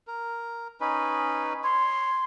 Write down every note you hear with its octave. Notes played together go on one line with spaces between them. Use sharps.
A#4
C#4 D#4 B4
C#5 C6